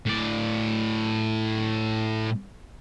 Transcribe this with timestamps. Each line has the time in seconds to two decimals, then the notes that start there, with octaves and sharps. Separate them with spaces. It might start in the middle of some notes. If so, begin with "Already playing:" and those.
0.06 A2 D5